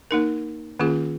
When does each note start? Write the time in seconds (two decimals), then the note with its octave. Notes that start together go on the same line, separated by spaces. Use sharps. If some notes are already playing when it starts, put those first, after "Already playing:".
0.11 A#3 D#4 A#4
0.79 D#3 A#3 C#4 F4 G#4